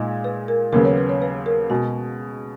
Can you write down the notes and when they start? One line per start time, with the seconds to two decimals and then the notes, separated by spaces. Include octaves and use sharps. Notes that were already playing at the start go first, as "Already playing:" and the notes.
Already playing: A#2 G#3 D#4
0.24 B4
0.48 A#4
0.72 D#2 C#3 F#3 B3 A#4
0.85 C#5
0.97 B4
1.09 C#5
1.22 B4
1.46 A#4
1.70 B2 G#3 F#4